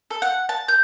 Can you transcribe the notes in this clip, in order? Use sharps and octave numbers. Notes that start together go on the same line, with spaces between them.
A4
F#5
A5
G6